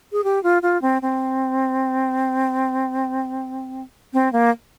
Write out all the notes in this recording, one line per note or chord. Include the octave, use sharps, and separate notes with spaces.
G#4
G4
F4
F4
C4
C4
C4
A#3